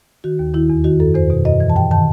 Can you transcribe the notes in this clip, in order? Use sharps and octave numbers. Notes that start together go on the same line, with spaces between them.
D#3 F#4
D#2
D#3 E4
E2
D#3 F#4
F#2 A4
E2 C5
B2
F#2 D#5
E3
A5
G2 G5
D#3 A5